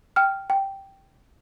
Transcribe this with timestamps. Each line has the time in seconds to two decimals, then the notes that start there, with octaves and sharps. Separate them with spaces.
0.16 G5 F6
0.50 G5